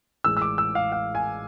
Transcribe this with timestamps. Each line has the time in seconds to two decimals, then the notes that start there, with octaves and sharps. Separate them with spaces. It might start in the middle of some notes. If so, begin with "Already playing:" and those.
0.24 A1 A2 G#3 E6
0.37 E6
0.42 D6
0.58 E6
0.75 F5
0.92 F5
1.15 G#5